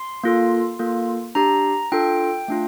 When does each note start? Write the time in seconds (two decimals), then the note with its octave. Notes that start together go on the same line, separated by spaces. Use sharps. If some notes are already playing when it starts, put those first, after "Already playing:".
Already playing: C6
0.24 A#3 F4 A4
0.79 A#3 F4 A4
1.35 D4 G4 A#5
1.92 D4 F4 A4 G5
2.48 A3 D4 F4